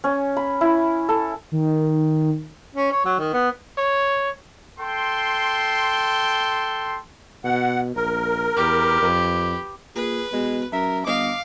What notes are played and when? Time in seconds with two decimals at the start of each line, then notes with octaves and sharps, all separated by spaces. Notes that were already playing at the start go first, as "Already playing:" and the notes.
0.04 C#4
0.37 B5
0.61 E4
1.09 A4
1.52 D#3
2.75 C#4
2.92 C#5
3.05 F#3
3.19 D#3
3.33 B3
3.78 C#5
4.80 A4 G5 C6
7.44 B2 F#5
7.95 A#1 A#4
8.56 E2 G4 B4
9.01 F2
9.96 A#2 G#4 B4
10.33 B2 G#3
10.73 F#2 A#4 E5
11.07 G1 D#5 F5 D6